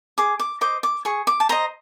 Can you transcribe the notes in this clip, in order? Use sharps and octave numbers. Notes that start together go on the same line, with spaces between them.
G#4 D6
D6
C5 D#5 D6
D6
G#4 C#6
D6
A5
C5 D#5 A#5